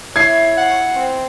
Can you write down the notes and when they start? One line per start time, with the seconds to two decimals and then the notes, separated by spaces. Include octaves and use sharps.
0.16 E2 E4 C#5 G#6 C7
0.57 F#5
0.95 C4